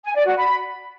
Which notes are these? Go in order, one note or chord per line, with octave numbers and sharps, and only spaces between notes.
G#5
D5
F#4
B5